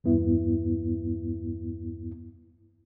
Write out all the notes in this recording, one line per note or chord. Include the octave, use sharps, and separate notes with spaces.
E2 G2 B3 E4